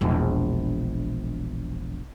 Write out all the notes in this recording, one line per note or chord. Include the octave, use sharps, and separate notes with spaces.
E1 A#1